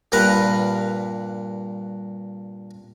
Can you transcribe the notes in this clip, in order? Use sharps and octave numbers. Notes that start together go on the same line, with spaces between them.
G2 A#2 A#4 B4 F#5